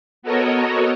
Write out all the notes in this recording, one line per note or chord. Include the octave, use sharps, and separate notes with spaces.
B3 F#4 A4 A#4 C#5 D#5